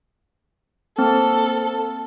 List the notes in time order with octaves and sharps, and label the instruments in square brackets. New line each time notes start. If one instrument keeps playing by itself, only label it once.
[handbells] A#3 C4 [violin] A4